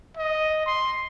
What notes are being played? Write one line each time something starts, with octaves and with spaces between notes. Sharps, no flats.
D#5
C6